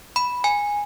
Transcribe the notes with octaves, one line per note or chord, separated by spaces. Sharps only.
B5
G#5